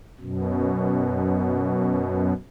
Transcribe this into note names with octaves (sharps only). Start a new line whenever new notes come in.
F#2 B2